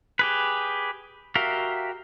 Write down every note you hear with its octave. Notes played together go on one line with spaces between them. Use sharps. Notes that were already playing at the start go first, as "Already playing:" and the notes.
G4 G#4 B4
F#4 G4 A#4 E5 F5